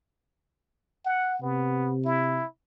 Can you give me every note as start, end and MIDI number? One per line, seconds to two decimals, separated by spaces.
1.05 1.41 78
1.42 2.42 48
1.42 1.94 59
2.05 2.45 64